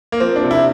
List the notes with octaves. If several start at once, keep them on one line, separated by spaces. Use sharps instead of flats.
A#3
F3 C4
D4
C3
E4